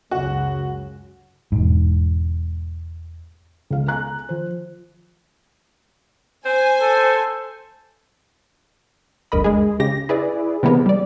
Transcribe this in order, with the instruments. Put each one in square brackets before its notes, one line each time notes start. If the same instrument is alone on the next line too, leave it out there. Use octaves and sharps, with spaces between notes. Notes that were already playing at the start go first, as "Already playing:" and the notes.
[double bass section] C#2 F#2 C#3 [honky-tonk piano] F#4
[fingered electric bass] E1 G#2
[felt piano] C#2 F5
G#5 A#5 F#6
F3 C5
[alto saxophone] C5 [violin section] G#5
[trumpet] A4
[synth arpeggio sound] G1 D2 A#4 D#5 B5
G#3 G#4
C#3 G4 A#6
E4 G#4 B4 D5
C3 E3 A#3 B3 G#4 A#4
G3 D5